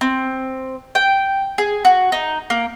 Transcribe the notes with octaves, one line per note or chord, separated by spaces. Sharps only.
C4
G5
G#4
F#4
D#4
A#3